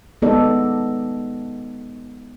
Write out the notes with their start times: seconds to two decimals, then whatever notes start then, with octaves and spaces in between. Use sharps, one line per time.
0.22 G#3 B3 D#4 A4 D5 D#5